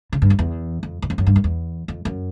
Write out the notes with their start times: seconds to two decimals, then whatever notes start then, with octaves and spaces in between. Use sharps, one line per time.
0.13 C#3
0.22 G2
0.30 F2
0.39 E2
0.83 F2
1.02 E2
1.10 F2
1.18 F#2
1.27 G2
1.36 F#2
1.44 E2
1.88 F2
2.05 F#2